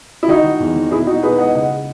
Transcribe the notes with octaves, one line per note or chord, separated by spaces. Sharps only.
E4
D#3 D#4 F#4
D#3
E2
D#3
B2 E4 G#4
B2 D#4 F#4
B2 G#4 B4
G#3 D#5 F#5
C#3 D#5 F#5
G#3